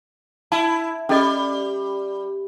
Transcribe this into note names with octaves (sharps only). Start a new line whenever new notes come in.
E4 A5
G3 C#4 A4 D#5